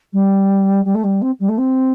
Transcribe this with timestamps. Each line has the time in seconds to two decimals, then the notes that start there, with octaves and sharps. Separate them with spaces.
0.13 G3
0.85 G3
0.95 A3
1.04 G3
1.22 C4
1.40 G3
1.49 A3
1.58 C4